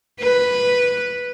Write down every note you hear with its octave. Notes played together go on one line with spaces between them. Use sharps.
B4